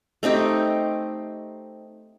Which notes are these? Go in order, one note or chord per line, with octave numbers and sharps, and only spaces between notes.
A3 C4 D#4 G4